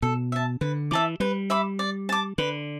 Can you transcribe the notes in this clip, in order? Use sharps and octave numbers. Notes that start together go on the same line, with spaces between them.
B2 A4
E5 A5
D3 B4
E3 E5 A5 D6
G3 B4
E5 B5 D6
D5
A5 D6
D3 B4